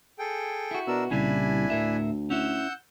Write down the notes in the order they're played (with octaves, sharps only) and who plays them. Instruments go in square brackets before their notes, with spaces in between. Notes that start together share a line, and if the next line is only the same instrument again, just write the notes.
[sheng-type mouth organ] G#4 A4 G5
[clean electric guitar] E4 F#4
[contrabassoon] B2 [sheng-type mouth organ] D4 A#4 E6
[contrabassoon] C2 [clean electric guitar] A#2 C#3 G3 [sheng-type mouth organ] D4 E4 G#5
[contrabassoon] D2 [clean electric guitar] A2 A#4 E5
[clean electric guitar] C#4 E4 [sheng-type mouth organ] F#5 E6 G6